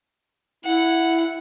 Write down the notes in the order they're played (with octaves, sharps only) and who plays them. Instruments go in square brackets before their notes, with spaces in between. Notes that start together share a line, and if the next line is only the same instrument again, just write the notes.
[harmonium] E4 [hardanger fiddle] F#5